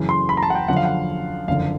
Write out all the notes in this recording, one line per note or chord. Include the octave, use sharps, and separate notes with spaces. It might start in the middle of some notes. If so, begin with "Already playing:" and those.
Already playing: F#2 C#3 E3
C6
B5
A#5
A5
F#5
G5
F#2 D3 F3 F#5
F5
F#5
F#1 F2 D3 F5